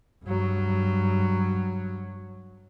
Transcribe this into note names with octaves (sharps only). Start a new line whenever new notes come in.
G2 F#3